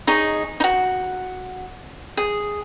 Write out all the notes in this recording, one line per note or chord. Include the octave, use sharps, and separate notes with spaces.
D#4 G#4 C#5
D#4 F#4
G#4